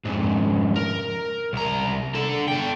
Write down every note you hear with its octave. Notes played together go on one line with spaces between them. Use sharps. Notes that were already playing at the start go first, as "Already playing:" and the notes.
F2 G#2
A#4
C2 A#5
D3 A4
A4 G5